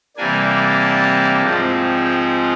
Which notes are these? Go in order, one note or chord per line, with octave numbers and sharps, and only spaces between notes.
C3 E3 G3 A#3 D4 G#5
A5
G#2 F3 G#3 C4
G5